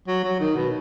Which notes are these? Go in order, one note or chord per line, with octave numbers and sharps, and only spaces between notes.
F#3
F#3
D#3
B2